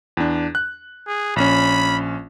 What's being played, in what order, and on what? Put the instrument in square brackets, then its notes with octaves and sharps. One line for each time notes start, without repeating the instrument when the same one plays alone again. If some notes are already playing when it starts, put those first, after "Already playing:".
[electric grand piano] E2 D4
F#6
[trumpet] G#4
[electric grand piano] A#1 C#4 [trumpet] B5